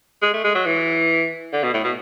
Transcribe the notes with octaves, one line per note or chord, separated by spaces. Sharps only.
G#3
A3
G#3
F#3
E3
D3
B2
A2
B2